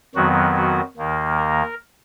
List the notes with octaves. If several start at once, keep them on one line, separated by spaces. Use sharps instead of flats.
F2 D#3 F#3 B3 F#4
F#4
D#2 D#3 A#3
A#4